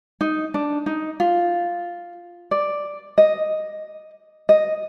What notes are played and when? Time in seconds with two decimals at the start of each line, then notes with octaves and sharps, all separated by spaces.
0.21 D#4
0.54 D4
0.86 D#4
1.20 F4
2.51 D5
3.18 D#5
4.49 D#5